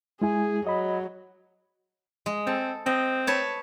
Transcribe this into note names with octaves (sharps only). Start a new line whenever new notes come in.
G#3 E4 G#4 G#5
F#3 D#5 B5
G#3
C4 A4
C4 D#5
B4 C#5 A5